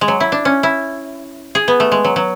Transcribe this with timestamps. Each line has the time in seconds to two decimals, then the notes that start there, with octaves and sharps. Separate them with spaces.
0.01 G#3
0.08 F#3
0.20 E4
0.32 D4
0.45 C#4
0.63 E4
1.55 G#4
1.68 B3
1.80 A3
1.92 G#3
2.05 F#3
2.16 F#3